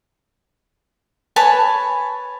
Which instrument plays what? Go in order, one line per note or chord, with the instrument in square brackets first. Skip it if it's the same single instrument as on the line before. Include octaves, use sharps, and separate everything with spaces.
[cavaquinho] B4 C#5 G#5 A5